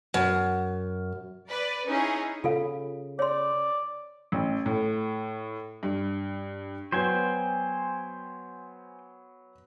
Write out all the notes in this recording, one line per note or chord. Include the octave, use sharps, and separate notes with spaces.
F#2
B4 D5
C#4 D#4 E4 G#4
C#3 F4 A4 F5
C#5 D5 C6
A1
A2
G2
F#3 B3 C5 G5 G#5